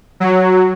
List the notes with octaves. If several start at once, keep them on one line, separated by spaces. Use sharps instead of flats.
F#3